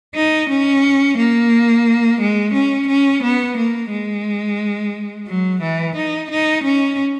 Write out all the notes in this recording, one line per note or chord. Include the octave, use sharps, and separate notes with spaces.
D#4
C#4
A#3
G#3
C#4
C#4
B3
A#3
G#3
F#3
E3
D#4
D#4
C#4